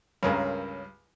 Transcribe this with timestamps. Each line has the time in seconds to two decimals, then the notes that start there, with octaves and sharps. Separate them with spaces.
0.23 C#2 G2 C#4 A#4